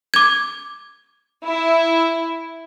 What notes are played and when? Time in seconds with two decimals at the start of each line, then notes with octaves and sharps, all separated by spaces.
0.14 D6 G#6
1.43 E4